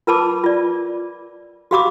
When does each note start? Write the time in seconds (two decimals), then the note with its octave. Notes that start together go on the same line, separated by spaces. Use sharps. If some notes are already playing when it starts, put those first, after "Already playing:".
0.07 F4 A#4 B4 A5 B5 D6
0.44 F4 D5
1.71 F#4 G4 F5 B5 D6 D#6